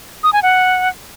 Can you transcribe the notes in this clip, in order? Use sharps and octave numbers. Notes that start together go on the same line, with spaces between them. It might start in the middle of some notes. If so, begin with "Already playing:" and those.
D#6
G#5
F#5